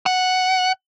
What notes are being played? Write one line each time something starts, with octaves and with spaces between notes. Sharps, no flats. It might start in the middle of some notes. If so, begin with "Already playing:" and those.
F#5